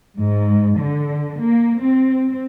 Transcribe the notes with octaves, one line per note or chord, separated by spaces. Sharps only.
G#2
D3
A#3
C4